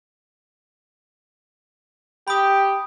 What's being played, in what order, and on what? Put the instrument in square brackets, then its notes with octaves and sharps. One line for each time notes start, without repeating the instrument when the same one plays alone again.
[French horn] G4 [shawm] G5 [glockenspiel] B5 D#6